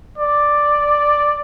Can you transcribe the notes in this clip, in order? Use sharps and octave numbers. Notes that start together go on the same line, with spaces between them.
D5